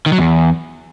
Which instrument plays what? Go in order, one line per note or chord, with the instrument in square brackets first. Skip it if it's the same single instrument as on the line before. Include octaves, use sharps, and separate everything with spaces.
[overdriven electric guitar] D#3
F#3
E2